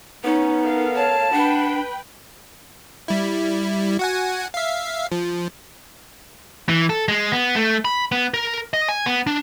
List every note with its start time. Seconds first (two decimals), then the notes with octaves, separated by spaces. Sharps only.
0.24 B3 C#4 D#4
0.62 A4 A#4 F5
0.95 C#5 A5
1.33 D4 B4 F#5 G5 B5
3.08 G3 E4
3.99 F#4 F#5 G#5
4.54 E5 F5
5.11 F3
6.69 E3
6.90 A4
7.08 G#3
7.32 B3
7.56 A3
7.85 B5
8.12 B3
8.34 A#4
8.74 D#5
8.89 G#5
9.06 B3
9.27 D4